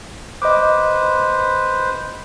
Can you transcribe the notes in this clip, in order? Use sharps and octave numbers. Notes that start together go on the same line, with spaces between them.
B4 C5 D#5 D6